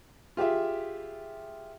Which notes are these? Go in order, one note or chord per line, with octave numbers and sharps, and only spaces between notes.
F4 G4 G#4 E5